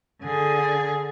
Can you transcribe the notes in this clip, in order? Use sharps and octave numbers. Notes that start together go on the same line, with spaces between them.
D3 G#4